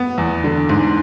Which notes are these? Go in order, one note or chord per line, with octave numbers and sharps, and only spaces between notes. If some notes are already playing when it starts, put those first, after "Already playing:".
Already playing: B3
E2
D3
G#2